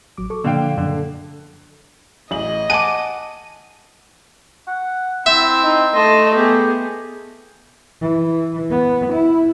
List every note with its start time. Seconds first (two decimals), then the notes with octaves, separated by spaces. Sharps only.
0.17 A1 F#3 D6
0.30 A4 C#6 D6
0.44 A#2 D3 F3 A#3 F5 G5
0.77 F#2 D3
0.90 A4
2.31 A1 G#4 D#5 F#7
2.70 F#5 G#5 A5 D6 D#7
4.67 F#5
5.26 C4 E4 E5
5.63 D#4
5.95 A3 D#5 A5 C6
6.35 B3 G4 G#4
8.01 E3
8.70 B3
9.12 E4